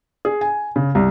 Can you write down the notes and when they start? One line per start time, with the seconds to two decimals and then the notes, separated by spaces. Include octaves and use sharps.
0.25 G#4
0.41 G#5
0.76 C#3
0.95 C2